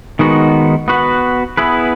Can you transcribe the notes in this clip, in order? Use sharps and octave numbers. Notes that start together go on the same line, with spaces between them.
D#3 G#3 B3 D#4 F#4
B3 F#4 B4
B3 E4 G#4 B4